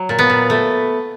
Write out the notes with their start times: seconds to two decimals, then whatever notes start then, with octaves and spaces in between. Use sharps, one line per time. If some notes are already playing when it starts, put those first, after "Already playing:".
Already playing: F#3
0.09 A#2
0.19 B3
0.30 A#2
0.50 A3